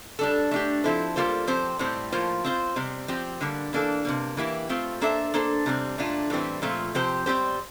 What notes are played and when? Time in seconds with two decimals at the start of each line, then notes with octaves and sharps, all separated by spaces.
0.19 G3 D4 A4
0.51 A3 D4 G4
0.84 F3 C4 E4 A4 C5
1.16 G3 A#3 F4 A4 C5
1.47 F3 C4 G4 C5
1.79 A2 G3 C4 G4 C5
2.12 A2 F3 A#3 F4 C5
2.44 C4 F4 C5
2.76 C3 G3 C4
3.08 F3 C4 G4
3.41 D3 G3 A#3
3.73 E3 A#3 D4 A4
4.05 C3 E3 A#3
4.37 E3 A#3 E4 G4
4.69 A3 C4 F4
5.01 A#3 D4 A4 C5 E5
5.34 A#3 D4 A4 C5
5.66 C3 G3 C4
5.98 A#2 A3 D4 F4
6.30 A2 E3 G3 C4
6.62 A#2 F3 A3 C4 F4
6.94 C3 F3 C4 G4 C5
7.26 G3 C4 G4 C5